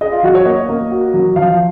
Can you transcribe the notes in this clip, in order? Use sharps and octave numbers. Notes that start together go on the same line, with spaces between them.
G#4 D#5
F4
F#3 F#4
C#5
A#3 D#5
A#3
F#4
F#3
F3 F5
F5